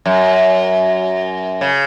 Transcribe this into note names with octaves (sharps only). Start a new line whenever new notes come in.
F#2
C#3